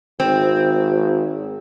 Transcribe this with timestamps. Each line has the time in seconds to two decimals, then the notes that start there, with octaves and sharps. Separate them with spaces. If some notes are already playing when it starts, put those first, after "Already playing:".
0.20 G#1 C4